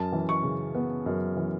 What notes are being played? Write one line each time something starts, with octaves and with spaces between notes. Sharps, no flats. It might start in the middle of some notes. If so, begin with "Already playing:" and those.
Already playing: F#2 A5
E3
C#6
C#3
B3
F#2
E3